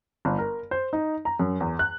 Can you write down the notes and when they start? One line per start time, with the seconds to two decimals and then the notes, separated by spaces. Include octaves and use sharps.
0.25 G1
0.38 A#4
0.71 C5
0.93 D#4
1.25 A#5
1.40 F#2
1.60 E2
1.79 F#6